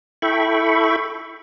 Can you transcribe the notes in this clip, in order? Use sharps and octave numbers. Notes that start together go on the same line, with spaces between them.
E4 A4 E5 G5 B5 C#6